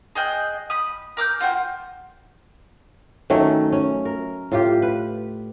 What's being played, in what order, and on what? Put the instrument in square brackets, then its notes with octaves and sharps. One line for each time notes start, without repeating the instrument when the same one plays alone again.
[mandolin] G#4 D#5 G5 F#6
B5 D#6
A#4 D6 F6 G6
F4 F#4 G5
[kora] D#3 F#3 A3 C#4
C#4
A#4
A2 F4 G4
B4